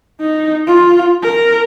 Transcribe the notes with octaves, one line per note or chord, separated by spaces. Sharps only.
D#4
F4
A#4